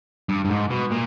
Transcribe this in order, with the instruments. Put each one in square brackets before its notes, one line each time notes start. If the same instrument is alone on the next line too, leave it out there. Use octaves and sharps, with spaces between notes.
[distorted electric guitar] G2
G2
G#2
B2
A#2